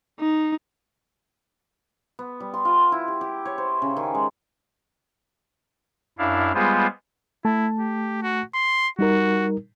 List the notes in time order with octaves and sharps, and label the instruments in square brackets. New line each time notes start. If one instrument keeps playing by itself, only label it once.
[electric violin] D#4
[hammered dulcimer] B3
G3
C6
F4
E4
G4
G4
C#5
C5
C#3
D#3
G#3
[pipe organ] F#2 D4 E4 F5
G3 G#3 B3 F4 G#4 C5
[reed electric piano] A3 A5 [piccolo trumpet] E4
[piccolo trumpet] G4
F#4
C6
[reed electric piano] G3 D#4 A#4 [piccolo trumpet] F#4